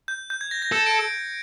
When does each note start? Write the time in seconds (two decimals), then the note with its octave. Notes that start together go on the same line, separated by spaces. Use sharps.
0.08 G6
0.30 G6
0.41 G#6
0.51 A#6
0.62 A#6
0.72 A4 C#7
0.86 D7
1.00 D7